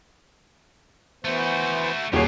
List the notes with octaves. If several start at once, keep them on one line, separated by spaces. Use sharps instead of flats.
E3 A3 B3 F#4 C5
D#1 B2 F#4 G#4 C#5 C7